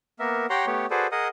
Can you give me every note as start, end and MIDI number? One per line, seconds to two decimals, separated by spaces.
0.19 0.46 58
0.19 0.46 59
0.19 0.46 70
0.19 0.46 76
0.50 0.66 67
0.50 0.66 73
0.50 0.66 78
0.50 0.66 79
0.50 0.66 82
0.50 0.66 84
0.66 0.86 57
0.66 0.86 59
0.66 0.86 67
0.66 0.86 73
0.90 1.07 66
0.90 1.07 68
0.90 1.07 69
0.90 1.07 71
0.90 1.07 72
0.90 1.07 74
1.12 1.28 68
1.12 1.28 70
1.12 1.28 75
1.12 1.28 78
1.12 1.28 87